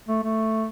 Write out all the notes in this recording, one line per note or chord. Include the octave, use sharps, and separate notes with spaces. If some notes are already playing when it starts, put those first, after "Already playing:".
A3
A3